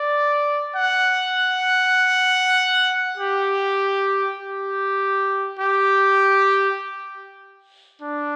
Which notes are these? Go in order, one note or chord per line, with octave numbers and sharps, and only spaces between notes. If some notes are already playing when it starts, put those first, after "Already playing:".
Already playing: D5
F#5
G4
G4
G4
D4